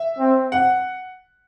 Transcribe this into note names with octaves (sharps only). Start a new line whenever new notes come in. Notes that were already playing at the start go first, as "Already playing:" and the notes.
Already playing: E5
C4
F#5